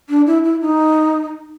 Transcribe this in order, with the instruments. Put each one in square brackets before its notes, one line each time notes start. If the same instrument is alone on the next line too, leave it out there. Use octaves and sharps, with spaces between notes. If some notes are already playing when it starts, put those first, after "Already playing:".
[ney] D4
E4
E4
D#4